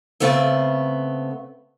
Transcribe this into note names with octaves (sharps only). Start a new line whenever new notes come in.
C#3 A3 B3 C4